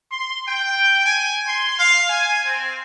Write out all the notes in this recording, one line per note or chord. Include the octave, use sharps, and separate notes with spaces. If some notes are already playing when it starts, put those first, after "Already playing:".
C6
G5
G#5
C6
F5
G#5
C4